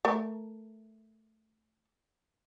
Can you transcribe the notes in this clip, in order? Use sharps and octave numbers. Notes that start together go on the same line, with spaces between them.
A3 A#4